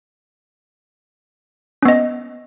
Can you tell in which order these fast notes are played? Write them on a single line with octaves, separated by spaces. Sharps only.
C#4 B3 D#5